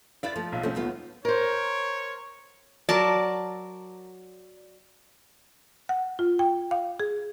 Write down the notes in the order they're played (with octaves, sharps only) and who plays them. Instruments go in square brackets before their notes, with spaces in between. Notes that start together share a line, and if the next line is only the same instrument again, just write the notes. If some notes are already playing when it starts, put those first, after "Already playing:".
[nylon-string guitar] E4 B4 D5 [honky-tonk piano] F5 A6
[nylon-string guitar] F3 [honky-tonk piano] A3
[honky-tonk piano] B1 F4
[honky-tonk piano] C#3 F3 A3 [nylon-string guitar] C4 C#4
[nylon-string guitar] D#2 B3 F4
[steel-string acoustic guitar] A#4 C5 [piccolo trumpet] C#5
[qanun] F#3 A#4 A5 [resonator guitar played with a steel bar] D5
[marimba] F#5
F4
G5
F5
G#4